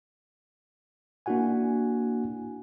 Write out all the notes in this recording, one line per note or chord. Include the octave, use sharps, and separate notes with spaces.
A#3 D4 E4 F#4 F#5 G#5